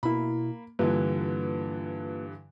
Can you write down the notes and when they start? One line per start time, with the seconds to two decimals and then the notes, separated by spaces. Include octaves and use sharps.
0.03 B2 A#3 E4 B5
0.79 G2 D3 E3 A#3 F4 B4